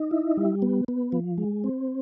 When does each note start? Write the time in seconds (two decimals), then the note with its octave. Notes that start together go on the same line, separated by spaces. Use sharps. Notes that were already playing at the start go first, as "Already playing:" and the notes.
Already playing: D#4
0.11 E4
0.37 G3
0.62 B3
0.88 B3
1.12 F3
1.38 G#3
1.64 C4